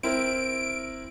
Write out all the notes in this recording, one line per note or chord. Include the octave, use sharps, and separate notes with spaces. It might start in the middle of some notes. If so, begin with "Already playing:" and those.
C4 E4 A#4 D7